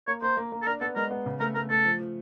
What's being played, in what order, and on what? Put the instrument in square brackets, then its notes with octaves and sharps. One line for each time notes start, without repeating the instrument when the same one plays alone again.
[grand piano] A#3 [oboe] C#5
[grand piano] A#3 [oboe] C5
[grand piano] A#3
A#3
[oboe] A4
[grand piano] D4 [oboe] A#4
[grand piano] B3 [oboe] A4
[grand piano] G#3 [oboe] A#4
[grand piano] B3
C#3
[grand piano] A3 [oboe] A#4
[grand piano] A3 [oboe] A#4
[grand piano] A3 [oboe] A4
[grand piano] F3
F3